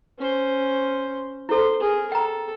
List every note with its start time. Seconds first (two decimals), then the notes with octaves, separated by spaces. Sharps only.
0.18 C#4 C5
1.49 E4 A4 C5
1.80 G#4 A#4
2.12 A4 G5 A#5